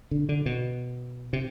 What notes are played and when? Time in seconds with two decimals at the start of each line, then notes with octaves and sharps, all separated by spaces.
0.11 D3
0.29 D3
0.46 B2
1.33 C3